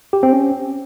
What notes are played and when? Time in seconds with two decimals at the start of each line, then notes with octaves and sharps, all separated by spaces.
0.13 G4
0.23 C4
0.33 C#4